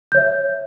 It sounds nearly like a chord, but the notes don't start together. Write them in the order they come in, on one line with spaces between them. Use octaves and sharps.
G6 C#5 E5